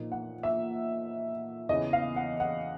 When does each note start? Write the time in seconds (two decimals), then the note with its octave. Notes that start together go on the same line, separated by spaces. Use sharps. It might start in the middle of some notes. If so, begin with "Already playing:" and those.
Already playing: A#2 F3 A#3 D#4
0.12 F#5
0.43 E5
1.69 E2 C#3 E3 D#5
1.93 F5
2.16 F#5
2.40 F#5